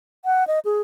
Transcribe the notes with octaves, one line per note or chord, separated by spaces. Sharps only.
F#5
D#5
G#4